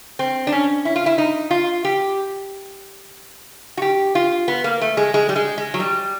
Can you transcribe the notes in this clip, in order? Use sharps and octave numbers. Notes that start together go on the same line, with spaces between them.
C4
D4
C#4
E4
F4
E4
D#4
F4
G4
F#4
G4
F4
B3
A#3
A3
G#3
G#3
G3
G#3
G#3
F#3
G3